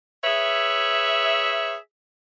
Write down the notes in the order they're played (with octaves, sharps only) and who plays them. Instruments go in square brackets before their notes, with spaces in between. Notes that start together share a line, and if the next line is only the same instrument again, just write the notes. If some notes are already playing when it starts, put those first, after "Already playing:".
[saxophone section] G#4 B4 C#5 E5